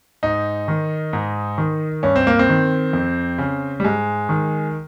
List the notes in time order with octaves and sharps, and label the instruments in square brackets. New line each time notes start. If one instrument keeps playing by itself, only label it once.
[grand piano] G#2 D#4
D#3
G#2
D#3
G2 C#4
C4
A#3
C4
D#3
F2
C#3
G3
G#2 G#3
D#3